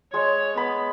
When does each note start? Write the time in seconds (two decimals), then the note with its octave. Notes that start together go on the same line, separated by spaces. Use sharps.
0.14 G#3 C#5
0.57 B3 B5